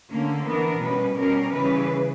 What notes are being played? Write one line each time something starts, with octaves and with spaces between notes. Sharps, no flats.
D3 A#3 C#4
E3 B3 D4 A#4
B2 G3 C#4 B4
B2 G3 C#4 A#4
C#3 E3 G3 B4